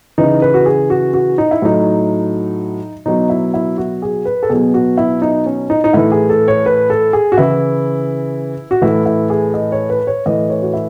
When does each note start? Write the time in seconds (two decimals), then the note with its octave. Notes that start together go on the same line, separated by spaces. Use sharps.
0.18 C#3 E3 D#4
0.42 B4
0.54 F#4
0.66 G#4
0.90 F#4
1.14 F#4
1.38 D#4
1.51 E4
1.62 A2 F#3 D#4
3.06 B2 F#3 D#4
3.30 E4
3.54 E4
3.78 F#4
4.02 G#4
4.25 B4
4.43 A4
4.49 B2 F#3 G#4
4.74 F#4
4.98 E4
5.22 D#4
5.46 C#4
5.70 D#4
5.84 D#4
5.93 A2 E3 E4
6.12 G#4
6.30 A4
6.48 C#5
6.66 B4
6.90 A4
7.13 G#4
7.32 F#4
7.37 C#3 E3 E4
8.71 F#4
8.82 A2 E3 E4
9.06 E4
9.30 G#4
9.54 D#5
9.72 C#5
9.90 B4
10.07 C#5
10.26 A2 E3 D#5
10.50 C#5
10.62 F#4
10.74 E4